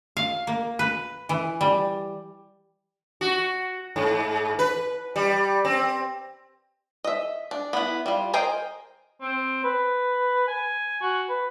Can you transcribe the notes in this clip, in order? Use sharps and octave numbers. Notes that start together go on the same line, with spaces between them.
F5
A#3
B4
E3
G3
F#4
G#2
B4
G3
C4
D#5 E5
D4
B3 E4
G3 F4
G#4 A#4 C5 D#5 G5
C4
B4
G#5
F#4
B4